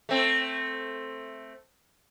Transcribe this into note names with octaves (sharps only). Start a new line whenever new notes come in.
A3 C4